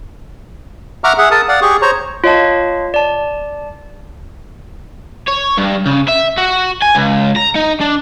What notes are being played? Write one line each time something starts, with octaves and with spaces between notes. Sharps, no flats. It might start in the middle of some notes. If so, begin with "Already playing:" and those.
E5 F#5 A#5 C#6 D6 F6
G#4 E5 F#5
A#4 A5 D#6
D5 F5 F#5
G4 G#4 C#6
C5 C#5 A#5 C#6
F4 C#5 D#5 F5 A5
D5 A5
C#5
G2
C#3
E5
F#4
G#5
C#2
A#5
D#4
D4